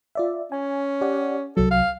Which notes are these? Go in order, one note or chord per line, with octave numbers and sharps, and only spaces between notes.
F4 D5 E5
C#4 G#5
G4 D5 F#5
C2 F#3 A4
F5